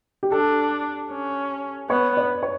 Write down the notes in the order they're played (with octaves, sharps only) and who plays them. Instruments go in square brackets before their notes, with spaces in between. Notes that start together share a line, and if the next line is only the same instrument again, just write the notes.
[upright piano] G4
[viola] D4 [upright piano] A4
[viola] C#4
[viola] B3 [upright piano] C#5
[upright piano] D5
C#5